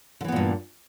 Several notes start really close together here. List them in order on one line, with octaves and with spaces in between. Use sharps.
D3 E3 B3 A#2 G2